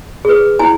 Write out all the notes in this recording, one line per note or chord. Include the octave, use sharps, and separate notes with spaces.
G#4 B4
E4 G#5